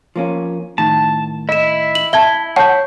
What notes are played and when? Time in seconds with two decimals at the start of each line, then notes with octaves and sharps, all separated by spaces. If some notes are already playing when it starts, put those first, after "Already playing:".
0.16 F3 A#3 C#4
0.78 A2 D#3 A5
1.49 E4 D#5 E7
1.95 F#7
2.13 E5 A5 G#6 G7
2.56 C#5 F#5 A5 G6